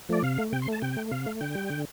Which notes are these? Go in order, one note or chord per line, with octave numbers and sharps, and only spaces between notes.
F3 A3 D5
C3 F5
A3
C3 G5
C6
A3 A5
C3 G5
A3
C3 F5
A3
D3 G5
G3
D3